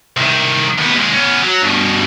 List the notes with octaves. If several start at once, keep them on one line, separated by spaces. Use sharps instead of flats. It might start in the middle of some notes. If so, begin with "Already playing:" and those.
C2 D#3
D#2 B3
D#2 G#3
B3 C#4
F#3
G2 B2